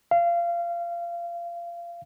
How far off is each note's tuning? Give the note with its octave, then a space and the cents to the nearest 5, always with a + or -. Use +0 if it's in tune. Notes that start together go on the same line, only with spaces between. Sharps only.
F5 -25